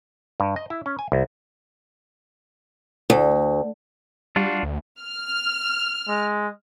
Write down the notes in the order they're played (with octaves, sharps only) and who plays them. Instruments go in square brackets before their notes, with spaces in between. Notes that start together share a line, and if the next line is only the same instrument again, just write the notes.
[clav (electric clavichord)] G2
D#5
E4
C#4
G#5
C2
[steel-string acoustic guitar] D2
[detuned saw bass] G3 [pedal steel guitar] D4 F4 F#4
[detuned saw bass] D2
[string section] F6
[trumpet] G#3